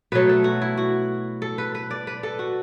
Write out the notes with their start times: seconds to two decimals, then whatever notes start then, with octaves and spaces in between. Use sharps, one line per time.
0.12 B2 F#3 A3 B4
0.29 A4
0.44 F#4
0.62 E4
0.77 F#4
1.42 A4
1.58 B4
1.75 B4
1.91 D5
2.07 B4
2.23 A4
2.39 F#4